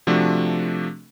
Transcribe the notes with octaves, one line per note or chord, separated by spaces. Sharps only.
C3 F3 A3 D4 F#4